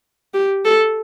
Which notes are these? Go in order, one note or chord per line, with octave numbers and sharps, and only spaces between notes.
G4
A4